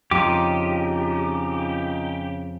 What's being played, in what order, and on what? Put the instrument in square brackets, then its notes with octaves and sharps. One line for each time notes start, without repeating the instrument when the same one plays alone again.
[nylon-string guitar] F2 [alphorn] C#3 [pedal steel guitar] D#4 F4 D6 [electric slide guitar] G4